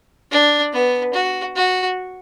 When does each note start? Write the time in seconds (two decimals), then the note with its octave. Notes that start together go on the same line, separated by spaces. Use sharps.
0.32 D4
0.73 B3
1.14 F#4
1.56 F#4